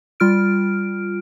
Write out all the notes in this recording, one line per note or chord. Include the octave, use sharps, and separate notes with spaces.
G3 F4 F6 D7